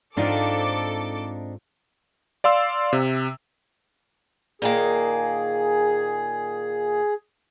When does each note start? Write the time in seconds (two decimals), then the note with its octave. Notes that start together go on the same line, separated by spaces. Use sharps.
0.17 G#2 C4 D4 D#4 F4 A4 C5 D6
2.44 D5 F5 C6 E6
2.93 C3
4.62 A#2 D#3 A#3 G#4